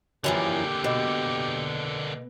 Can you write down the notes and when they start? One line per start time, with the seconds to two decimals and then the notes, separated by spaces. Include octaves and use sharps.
0.24 F#2 D3 E3 F3 A#3 G4
0.84 B2